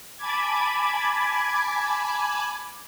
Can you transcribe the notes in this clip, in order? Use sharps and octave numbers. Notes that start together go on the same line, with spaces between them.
G#5 A5 B5 D6 G#6